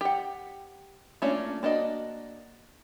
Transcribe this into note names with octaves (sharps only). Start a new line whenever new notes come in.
G4 F#5
A3 A#3 C#4 D4 F4
A#3 D4 F#4 D#5